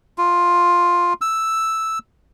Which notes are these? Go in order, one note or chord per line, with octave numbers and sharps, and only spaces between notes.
F4
E6